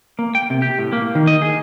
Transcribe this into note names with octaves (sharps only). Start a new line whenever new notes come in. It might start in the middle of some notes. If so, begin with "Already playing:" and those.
A#3
G5
C3
G4
A2
A#3
D#3
D#5
G#4